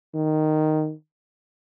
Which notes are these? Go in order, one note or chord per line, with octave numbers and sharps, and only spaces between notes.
D#3